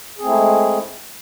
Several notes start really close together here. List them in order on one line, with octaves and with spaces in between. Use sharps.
G#4 C4 A3 E4 G#3